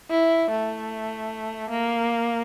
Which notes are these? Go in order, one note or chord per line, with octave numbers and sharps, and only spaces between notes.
E4
A3
A#3